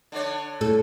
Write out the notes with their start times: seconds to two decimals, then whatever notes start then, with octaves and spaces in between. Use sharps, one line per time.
0.12 D3 D4 C#5
0.61 A2 A4